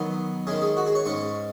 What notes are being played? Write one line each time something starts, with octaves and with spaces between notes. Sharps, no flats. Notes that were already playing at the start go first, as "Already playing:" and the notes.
Already playing: D#3 F#3 B3
D#3 G#3 C#4 G#4
G#4
F#4
G#4
C#5
G#2 G#3 C#4 C#6